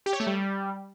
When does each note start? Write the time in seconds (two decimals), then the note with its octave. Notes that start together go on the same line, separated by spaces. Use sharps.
0.06 G4
0.13 C#5
0.20 A3
0.27 G3